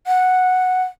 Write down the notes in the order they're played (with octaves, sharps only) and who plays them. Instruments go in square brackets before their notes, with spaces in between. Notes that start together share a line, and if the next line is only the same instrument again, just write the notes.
[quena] F#5